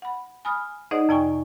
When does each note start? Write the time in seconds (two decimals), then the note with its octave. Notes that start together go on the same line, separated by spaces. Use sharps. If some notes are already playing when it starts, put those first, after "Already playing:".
0.02 F#5 B5
0.45 G#5 B5 D#6 F6
0.91 D#4 G#4 C5 D5 D#5 F#5
1.09 F2 C3 D5 G5 G#5 C#6